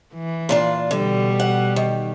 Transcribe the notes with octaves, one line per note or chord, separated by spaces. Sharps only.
E3
A#2 D4 F4
B2 D3 G3
F#5
D#3